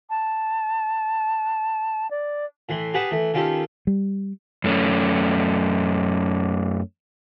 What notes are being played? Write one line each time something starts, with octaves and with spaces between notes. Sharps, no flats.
A5
D5
A2 E3 C6
G4 G#4 B4 F#5 A5
E3 A3
D#3 C#4 F4 G4 A4
G3
F#2 A3 C#4